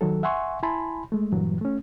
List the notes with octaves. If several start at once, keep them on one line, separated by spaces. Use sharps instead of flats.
D#3 F#3 A4
E5 F#5 G#5 C6 C#6
E4 G#5 A5 B5 C6
G#3 A3
G2 A#2 E3 F#3
A3 C#4